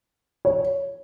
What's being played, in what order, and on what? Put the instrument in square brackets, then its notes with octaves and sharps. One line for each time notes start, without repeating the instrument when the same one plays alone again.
[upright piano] C#5